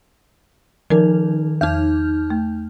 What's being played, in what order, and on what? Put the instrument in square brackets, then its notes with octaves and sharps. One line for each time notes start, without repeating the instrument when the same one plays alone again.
[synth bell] D#3 F3 D#4 [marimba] A#4
[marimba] E2 [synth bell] D#4 F6 G6
[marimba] A3